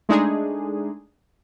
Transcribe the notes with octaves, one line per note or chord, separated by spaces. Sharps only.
G#3 A3 D4 D#4 G#4